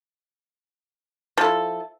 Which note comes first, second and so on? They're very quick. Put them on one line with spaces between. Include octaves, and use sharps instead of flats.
F3 A4 E4